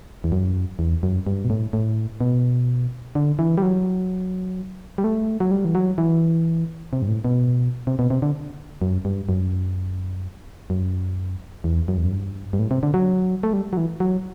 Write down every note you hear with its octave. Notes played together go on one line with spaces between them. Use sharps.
E2
F#2
E2
F#2
G2
B2
A2
A2
B2
D3
E3
G3
F#3
G3
A3
F#3
G3
E3
F#3
E3
C3
G2
A2
B2
C3
B2
C3
D3
F#2
G2
F#2
F#2
E2
F#2
E2
F#2
G2
G2
A2
C3
D3
F#3
A3
G3
F#3
E3
F#3